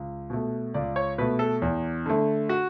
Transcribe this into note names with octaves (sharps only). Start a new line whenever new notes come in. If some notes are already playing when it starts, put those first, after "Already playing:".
Already playing: C#2
B2 A3
C#2 D5
C#5
B2 A3 B4
A4
E2
D3 A3
F#4